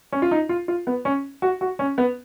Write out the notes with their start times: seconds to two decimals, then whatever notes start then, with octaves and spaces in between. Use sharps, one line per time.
0.12 C#4
0.22 F4
0.31 D#4
0.49 F4
0.68 F4
0.87 B3
1.05 C#4
1.42 F#4
1.61 F#4
1.79 C#4
1.98 B3